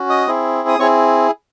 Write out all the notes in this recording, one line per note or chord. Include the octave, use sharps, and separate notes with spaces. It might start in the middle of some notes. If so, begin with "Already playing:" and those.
Already playing: C#4 F#4
D#5 D#6
C4 E4 G#4
D#6
C4 E4 G#4 C#5 C#6